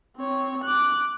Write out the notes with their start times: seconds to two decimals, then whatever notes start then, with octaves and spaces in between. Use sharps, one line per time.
0.16 C4 C#5
0.64 D6 F#6